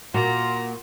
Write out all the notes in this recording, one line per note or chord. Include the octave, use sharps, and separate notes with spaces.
A#2 F4 F#4 A#5